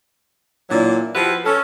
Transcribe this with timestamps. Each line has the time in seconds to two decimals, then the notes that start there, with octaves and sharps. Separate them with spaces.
0.70 A#2 E3 F#3 D4 E4
1.14 F3 E4 F#4 G4 B4
1.45 C#4 A4